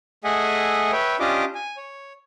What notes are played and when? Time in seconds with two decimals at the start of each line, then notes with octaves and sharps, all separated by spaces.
0.24 A3 G#4 D#5 E5 F#5 G#5
0.92 B4 C#5 E5 G5
1.20 C#4 D4 F4 G4 D#5 D6
1.55 G#5
1.77 C#5